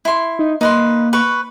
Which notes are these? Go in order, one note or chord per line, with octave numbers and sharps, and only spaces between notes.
E4 C6
D#4
A#3 D#4 B4 C6
B4 C#6